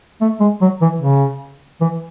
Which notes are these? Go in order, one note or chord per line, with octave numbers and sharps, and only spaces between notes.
A3
G#3
F#3
E3
C#3
E3